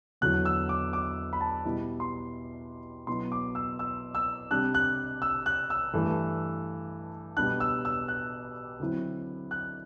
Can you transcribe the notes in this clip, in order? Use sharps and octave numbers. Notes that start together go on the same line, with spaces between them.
E2 D3 F#3 B3 E4 F#6
E6
D6
D6
B5
A5
B2 G3 B3 E4
C6
B2 F#3 B3 E4 C6
D6
E6
E6
E6
C3 G3 D4 F#6
F#6
E6
F#6
E6
G2 E3 A3
B2 G3 B3 D4 F#6
E6
E6
F#6
D3 F#3 C4 E4
F#6